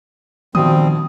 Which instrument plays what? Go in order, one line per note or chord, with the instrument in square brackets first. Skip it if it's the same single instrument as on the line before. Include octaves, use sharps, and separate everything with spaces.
[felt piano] A#1 B2 D#6 [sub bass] D#3 [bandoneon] F3 G3 C4